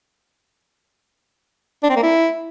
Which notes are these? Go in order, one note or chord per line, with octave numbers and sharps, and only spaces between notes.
D4
C4
A#3
E4